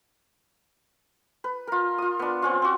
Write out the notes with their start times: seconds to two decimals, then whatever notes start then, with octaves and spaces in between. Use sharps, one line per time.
1.44 B4
1.67 F4 A#4
1.98 F4 D#6
2.19 B3 D4
2.42 C4 C#4 F4
2.62 C4 F#4